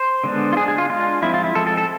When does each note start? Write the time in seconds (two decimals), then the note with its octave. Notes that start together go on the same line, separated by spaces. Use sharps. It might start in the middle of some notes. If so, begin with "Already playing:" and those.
Already playing: C5
0.24 D3 G#3 B3 D4
0.53 F4
0.57 G#3 D4 G#4
0.68 G#4
0.78 F4
0.89 G#3 D4 F4
1.22 F3 G#3 C4 E4
1.34 F4
1.44 E4
1.55 F3 G#3 C4 A4
1.67 A4
1.78 A4